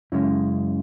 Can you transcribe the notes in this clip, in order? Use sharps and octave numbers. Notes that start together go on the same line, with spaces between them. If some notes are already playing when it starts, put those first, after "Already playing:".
F#2 C#3 G#3 C#4 E4